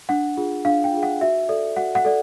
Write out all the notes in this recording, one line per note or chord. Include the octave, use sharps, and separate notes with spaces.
D4 F#5
F4 G#4
D4 F5
G5
F4 G#4
F#5
F#4 E5
A4 D5
F#4 F#5
F#5
A4 D5